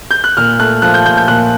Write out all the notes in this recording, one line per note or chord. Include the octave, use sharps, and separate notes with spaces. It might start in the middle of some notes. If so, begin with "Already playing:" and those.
G6
F#6
A#2 F6
A3 F#6
F3 F#6
G6
A#2 G6
G6
A#2 F#6